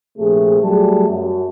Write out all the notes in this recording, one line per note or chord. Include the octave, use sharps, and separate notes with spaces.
A#1 C3 A3 G#4
F#3 G3 A3 G#4 A5
F#2